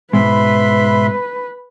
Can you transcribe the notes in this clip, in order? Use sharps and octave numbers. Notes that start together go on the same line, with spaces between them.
G#2 B2 G#3 B4 E5 B5 C6